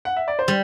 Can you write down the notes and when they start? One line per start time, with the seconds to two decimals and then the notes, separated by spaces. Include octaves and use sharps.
0.05 F#5
0.16 E5
0.28 D5
0.39 C5
0.48 G3